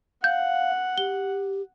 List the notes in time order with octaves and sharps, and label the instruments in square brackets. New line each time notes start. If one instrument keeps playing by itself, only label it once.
[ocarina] F5 [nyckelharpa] F#5 [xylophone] G6
[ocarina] G4 [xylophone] G7